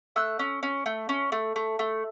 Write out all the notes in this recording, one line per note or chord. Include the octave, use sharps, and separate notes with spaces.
A3 E6 F#6
C#4
C#4
A3
C#4
A3
A3
A3